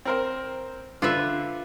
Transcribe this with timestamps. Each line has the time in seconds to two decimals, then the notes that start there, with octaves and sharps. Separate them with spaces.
0.05 C4 A#4 C5
1.02 D3 F4 B4 E5